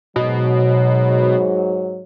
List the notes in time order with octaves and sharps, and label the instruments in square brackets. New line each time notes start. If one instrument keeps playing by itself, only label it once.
[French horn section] G#2 F#3 [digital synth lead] B2